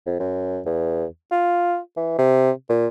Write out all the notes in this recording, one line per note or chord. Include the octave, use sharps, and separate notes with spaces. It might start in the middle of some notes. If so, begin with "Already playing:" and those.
F2
F#2
E2
F4
E3
C3
A#2